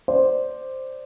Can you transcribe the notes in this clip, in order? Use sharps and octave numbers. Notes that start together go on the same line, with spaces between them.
C5 D5